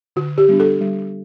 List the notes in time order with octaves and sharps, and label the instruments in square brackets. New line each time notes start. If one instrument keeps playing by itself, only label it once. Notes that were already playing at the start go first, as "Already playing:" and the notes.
[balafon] D3 F#4
G4
G3 B3 D4
A4
G3